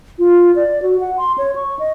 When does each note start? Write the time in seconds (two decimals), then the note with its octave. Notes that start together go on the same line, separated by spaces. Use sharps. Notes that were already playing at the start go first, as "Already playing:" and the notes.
0.19 F4
0.56 D5
0.82 F#4
1.01 F#5
1.18 C6
1.38 C#5
1.56 C#6
1.79 D#5